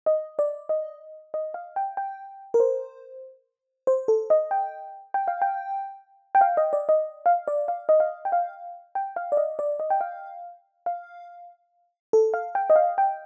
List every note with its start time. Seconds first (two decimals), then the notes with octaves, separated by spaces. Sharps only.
0.06 D#5
0.39 D5
0.69 D#5
1.34 D#5
1.54 F5
1.76 G5
1.97 G5
2.54 A#4
2.60 C5
3.87 C5
4.08 A4
4.30 D#5
4.51 G5
5.14 G5
5.28 F5
5.42 G5
6.35 G5
6.41 F5
6.57 D#5
6.73 D5
6.89 D#5
7.26 F5
7.48 D5
7.68 F5
7.89 D#5
8.00 F5
8.25 G5
8.32 F5
8.95 G5
9.16 F5
9.32 D5
9.37 D#5
9.59 D5
9.80 D#5
9.90 G5
10.01 F5
10.86 F5
12.13 A4
12.34 F5
12.55 G5
12.70 D#5
12.76 F5
12.98 G5